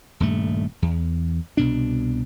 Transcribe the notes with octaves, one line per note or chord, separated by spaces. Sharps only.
D#1 G2 A3
E2
C2 B2 D4